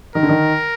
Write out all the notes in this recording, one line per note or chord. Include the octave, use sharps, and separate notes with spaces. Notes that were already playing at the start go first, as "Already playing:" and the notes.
D#3 A#4
D3
D#3